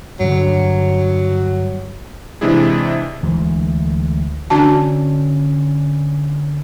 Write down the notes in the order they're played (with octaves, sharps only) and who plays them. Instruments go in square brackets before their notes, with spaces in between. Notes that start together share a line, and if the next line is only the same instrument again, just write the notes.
[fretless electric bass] G2 D3 [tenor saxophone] F#3
[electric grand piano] C3 E3 G#3 D4 E4 G#4
[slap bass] D2 E3 G#3
[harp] D3 C#4 [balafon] D4 F#4 A5